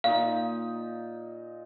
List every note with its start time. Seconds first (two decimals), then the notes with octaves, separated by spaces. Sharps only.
0.04 A#2 D#4 F5